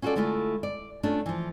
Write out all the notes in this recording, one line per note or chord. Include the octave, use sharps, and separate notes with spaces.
C#4 F4 F#4 G#4 A4 D5
D3 G#3 A3 E4 F4
D5
A3 C#4 D4 F4
E3 F3